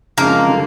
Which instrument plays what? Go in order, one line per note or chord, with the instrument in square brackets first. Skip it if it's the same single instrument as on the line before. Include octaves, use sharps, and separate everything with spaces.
[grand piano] F#2 C#3 F3 G#3 C4 [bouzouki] A#3
[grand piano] D3 G3